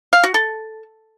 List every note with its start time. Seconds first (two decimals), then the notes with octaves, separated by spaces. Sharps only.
0.13 F5
0.24 F#4
0.34 A4